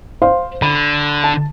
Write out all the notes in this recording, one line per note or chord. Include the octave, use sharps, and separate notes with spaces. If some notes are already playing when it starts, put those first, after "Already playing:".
C5 F5 C6
D3 B5
A5